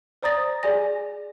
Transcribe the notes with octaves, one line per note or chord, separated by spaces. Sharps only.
C5 D5 A#5 D#6 A6 A#6
G#4 D5 G#5 A#6